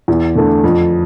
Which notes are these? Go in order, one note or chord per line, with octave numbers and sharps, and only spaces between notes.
E2
D3 A3
F2